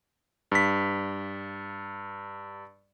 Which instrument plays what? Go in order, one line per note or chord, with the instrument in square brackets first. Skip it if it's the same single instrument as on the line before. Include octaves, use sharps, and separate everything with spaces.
[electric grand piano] G2 B6